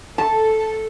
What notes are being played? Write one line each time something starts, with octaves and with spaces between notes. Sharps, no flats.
A4 A5